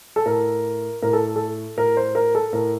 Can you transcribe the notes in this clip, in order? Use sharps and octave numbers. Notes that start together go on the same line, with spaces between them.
A4
A2 A#4
A2 A#4
A4
A4
A2 A#4
C5
A#4
A4
A2 A#4